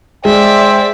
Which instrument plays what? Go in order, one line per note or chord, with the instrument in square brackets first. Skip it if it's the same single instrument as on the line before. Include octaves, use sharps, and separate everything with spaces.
[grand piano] G#3 [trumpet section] C5 G5 [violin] D5 E5